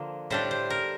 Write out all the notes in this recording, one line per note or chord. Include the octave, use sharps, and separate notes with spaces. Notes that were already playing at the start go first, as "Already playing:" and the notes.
Already playing: D3 F3 A#3 D4
A2 G3 D4 C5
C5
A#4